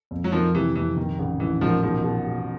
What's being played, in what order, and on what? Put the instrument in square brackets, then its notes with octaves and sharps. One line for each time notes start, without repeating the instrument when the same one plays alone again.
[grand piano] F2
[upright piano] F#3
[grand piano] F2 [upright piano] D#3 F3
[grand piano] C3 [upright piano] E3
[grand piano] F2 [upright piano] E3
[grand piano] D#3
A1
[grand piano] A1 [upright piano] E3
[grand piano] A1 [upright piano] D#3 F3
[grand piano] B2 [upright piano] D#3 F3
[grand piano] B2
B2